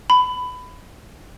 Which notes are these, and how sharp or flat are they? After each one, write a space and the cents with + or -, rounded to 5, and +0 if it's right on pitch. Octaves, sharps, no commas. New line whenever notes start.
B5 +20